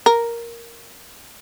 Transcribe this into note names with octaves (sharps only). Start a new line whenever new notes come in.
A#4